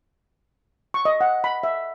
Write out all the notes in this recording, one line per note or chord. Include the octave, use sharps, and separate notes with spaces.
C#6
D#5
F#5
B5
E5